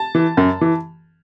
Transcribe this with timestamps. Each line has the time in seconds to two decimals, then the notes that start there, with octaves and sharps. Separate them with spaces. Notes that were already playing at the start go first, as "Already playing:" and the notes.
Already playing: A5
0.15 E3
0.37 F#2
0.61 E3